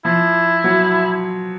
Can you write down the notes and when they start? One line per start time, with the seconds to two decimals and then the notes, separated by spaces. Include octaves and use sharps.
0.05 F3 E4
0.64 F#3